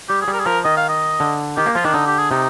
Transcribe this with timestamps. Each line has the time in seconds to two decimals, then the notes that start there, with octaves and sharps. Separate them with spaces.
0.09 G3 G4
0.21 G#4
0.28 G3
0.34 A#4
0.40 G#4
0.46 F3 A#4
0.64 D#3 D#5
0.77 F5
0.89 D#5
1.20 D3
1.57 D#3 G4
1.66 A#3
1.75 F3 F4
1.85 D#3 D4
1.94 D3 D#4
2.07 G4
2.19 G#4
2.31 C3 D#4